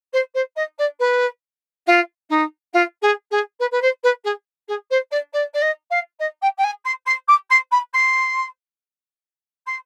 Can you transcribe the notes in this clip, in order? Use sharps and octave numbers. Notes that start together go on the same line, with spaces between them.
C5
C5
D#5
D5
B4
F4
D#4
F4
G#4
G#4
B4
B4
C5
B4
G#4
G#4
C5
D5
D5
D5
D#5
F5
D#5
G5
G5
G#5
C6
C6
D6
C6
B5
C6
C6